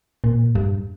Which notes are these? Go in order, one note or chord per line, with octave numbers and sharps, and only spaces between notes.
A#2
G2